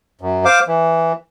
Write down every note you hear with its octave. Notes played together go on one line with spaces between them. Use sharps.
F#2
C5 F5 D6
E3